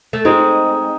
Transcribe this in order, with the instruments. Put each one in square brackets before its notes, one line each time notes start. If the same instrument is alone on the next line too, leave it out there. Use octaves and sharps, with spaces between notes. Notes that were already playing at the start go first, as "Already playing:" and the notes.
[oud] A3
[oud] G#3 C4 [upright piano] D#4